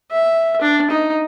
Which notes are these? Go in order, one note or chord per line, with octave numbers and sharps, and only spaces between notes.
E5
D4
D#4